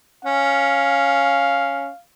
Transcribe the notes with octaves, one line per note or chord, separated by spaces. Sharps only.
C#4 F5